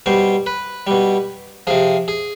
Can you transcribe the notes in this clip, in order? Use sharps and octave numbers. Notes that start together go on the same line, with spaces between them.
B2 G3 C5
B4
B2 G3
C3 F3 G#4
G#4